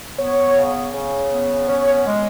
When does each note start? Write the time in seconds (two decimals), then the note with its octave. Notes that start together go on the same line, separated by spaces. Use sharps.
0.17 B3 C#5
0.56 C#3
0.93 C#3
1.31 B3
1.68 C#4 C#5
2.06 G#3